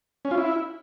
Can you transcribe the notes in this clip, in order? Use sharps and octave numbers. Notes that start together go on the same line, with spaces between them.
C#4
F4
E4